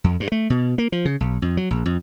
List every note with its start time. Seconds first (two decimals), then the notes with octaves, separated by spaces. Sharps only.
0.04 F2
0.20 G2
0.32 A3
0.50 B2
0.78 A#3
0.92 F3
1.05 C#3
1.20 B1
1.42 F2
1.57 F#3
1.71 A#1
1.86 F2